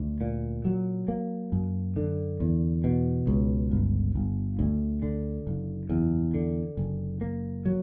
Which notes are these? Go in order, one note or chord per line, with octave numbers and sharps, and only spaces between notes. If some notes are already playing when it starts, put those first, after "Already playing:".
Already playing: D2
A#2
F#3
A#3
F#2
D3
E2
B2
C#2
G1
G1
D2
D3
F#1
E2
D3
F#1
A#3
F#3